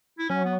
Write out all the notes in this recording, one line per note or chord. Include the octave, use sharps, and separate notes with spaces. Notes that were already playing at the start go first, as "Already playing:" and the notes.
E4
F#3 C#4
B3